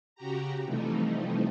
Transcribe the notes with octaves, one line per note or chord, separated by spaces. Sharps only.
C#3 F#4 G4 A#5
C3 E3 F3 G3 A3 D#4